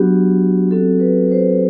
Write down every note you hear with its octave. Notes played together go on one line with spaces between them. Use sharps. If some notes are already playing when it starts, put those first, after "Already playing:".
Already playing: F#3 B3 D4 F#4 G4
F#3 C4 F#4 A4
B4
C5